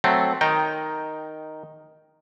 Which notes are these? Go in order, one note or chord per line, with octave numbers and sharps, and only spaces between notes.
F#3 A3 C4
D#3 D#4 G5